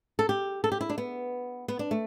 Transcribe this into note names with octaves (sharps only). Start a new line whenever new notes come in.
A4
G4
A4
G4
E4
D4
B3
B3
D4
A3